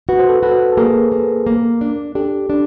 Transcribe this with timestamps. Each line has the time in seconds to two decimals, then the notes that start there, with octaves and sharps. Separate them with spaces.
0.09 F#4 B4
0.19 C5
0.29 A4 B4
0.43 F#4 A4 B4
0.73 A4
0.77 A#3 G#4 A#4
1.12 A#3
1.47 A#3
1.81 D4
2.15 D4 G4 A4
2.50 D4